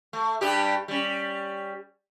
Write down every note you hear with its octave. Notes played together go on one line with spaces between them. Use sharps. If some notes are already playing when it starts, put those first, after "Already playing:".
A3
G2 G3 G4
G3 C#4